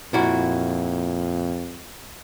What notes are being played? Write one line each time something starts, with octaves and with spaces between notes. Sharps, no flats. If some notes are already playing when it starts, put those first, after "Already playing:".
F2 A#2 E4 F#4